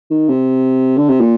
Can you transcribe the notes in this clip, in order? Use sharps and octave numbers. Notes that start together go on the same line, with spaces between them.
D#3
C3
D3
C3
A#2